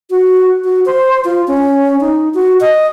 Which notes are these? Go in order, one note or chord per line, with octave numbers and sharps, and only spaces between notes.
F#4
F#4
C5
F4
C#4
D#4
F#4
D#5